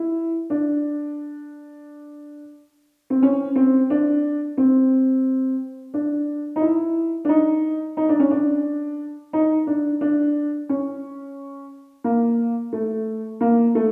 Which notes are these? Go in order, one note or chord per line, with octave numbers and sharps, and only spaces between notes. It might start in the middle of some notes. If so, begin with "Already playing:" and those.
Already playing: E4
D4
C4
C#4
C4
D4
C4
D4
D#4
E4
D4
D#4
D#4
D4
C#4
D4
D#4
D4
D4
C#4
A#3
A3
A#3
A3